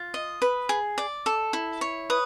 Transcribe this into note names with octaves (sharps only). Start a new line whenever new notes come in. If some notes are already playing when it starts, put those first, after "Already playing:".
Already playing: F4
D#5
B4
G#4
D5
A4
E4
C#5
B4 D#6